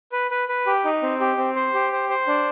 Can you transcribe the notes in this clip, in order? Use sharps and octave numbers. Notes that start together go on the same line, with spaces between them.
B4
B4
B4
G4
D#4
C4
G4
C4
C5
G4
C5
C5
D4